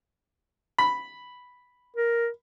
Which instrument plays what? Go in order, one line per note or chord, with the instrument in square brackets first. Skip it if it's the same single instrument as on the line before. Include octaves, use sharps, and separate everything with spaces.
[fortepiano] B5
[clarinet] A#4